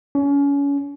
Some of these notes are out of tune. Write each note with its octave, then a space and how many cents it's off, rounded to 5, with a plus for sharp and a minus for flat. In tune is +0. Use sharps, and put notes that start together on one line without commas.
C#4 +30